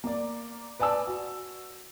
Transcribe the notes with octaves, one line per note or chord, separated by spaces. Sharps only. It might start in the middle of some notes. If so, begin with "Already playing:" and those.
A#3 D5
B4 D5 G#5 A5 E6
F#4